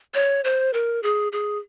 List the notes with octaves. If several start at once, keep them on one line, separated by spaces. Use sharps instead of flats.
C#5
C5
A#4
G#4
G#4